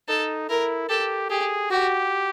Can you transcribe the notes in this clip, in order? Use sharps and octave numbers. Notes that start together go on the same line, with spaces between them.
D#4 A4
E4 A#4
G4 A4
G4 G#4
F#4 G4